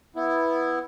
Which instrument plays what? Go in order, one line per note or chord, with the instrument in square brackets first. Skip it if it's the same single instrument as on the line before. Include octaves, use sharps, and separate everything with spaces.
[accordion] B3 E4